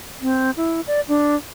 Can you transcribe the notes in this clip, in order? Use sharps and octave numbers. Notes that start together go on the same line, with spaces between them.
C4
E4
D5
D4